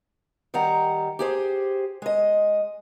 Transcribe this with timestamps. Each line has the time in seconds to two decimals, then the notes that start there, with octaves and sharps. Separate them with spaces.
0.54 D#3 G3 F#5 A#5
1.19 G4 G#4 C5
2.02 G#3 D#5